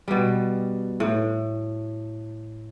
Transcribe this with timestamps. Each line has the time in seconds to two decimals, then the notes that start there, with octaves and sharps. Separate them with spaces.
0.08 B2 G3
1.00 A2